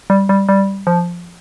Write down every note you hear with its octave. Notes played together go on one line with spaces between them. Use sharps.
G3
G3
G3
F3